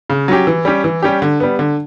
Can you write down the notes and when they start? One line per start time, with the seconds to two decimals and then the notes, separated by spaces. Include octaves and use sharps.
0.10 C#3
0.28 F#3 C#4 G4
0.47 E3
0.65 G3 C#4 G4
0.84 E3
1.03 G3 C#4 G4
1.22 D3
1.40 G3 B3
1.59 D3